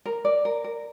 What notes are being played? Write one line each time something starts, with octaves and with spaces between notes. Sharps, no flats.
A#4
D5
A#4
A#4